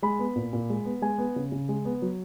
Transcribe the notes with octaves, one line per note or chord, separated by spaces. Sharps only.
G#3 B5
B3
A#2
A#2
G#3
B3
G#3 G#5
B3
C#3
C#3
G#3
B3
F#3